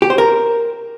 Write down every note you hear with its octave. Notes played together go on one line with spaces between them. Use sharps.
G4
C5
A#4